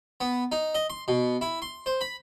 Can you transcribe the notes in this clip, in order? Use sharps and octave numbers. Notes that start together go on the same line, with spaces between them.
B3
D#4
D#5
C6
B2
E4
C6
C5
B5